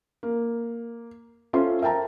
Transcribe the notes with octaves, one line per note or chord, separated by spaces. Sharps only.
A#3
C#4 F4 A4 C5 E5 C6
A#4 E5 G5 A5 A#5